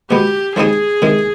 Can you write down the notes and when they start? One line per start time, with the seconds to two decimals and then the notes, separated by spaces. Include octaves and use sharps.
0.11 B2 G#3 B3 G4
0.56 F3 G#3 C4 D#4 G4 G#4
1.02 C3 D#3 G#3